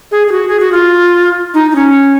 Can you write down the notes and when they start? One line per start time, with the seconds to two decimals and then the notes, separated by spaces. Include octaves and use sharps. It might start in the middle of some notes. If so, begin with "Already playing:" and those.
0.11 G#4
0.27 G#4
0.32 F#4
0.48 G#4
0.60 F#4
0.72 F4
1.54 D#4
1.71 D#4
1.75 C#4